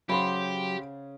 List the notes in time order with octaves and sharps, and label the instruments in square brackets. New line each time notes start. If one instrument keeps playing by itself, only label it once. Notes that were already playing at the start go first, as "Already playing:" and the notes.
[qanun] C#3 C5 F#5 [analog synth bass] F#3 [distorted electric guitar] G4 [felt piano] B5 C6